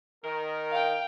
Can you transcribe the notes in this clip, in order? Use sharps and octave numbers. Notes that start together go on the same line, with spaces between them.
D#3 A#4
F5 G5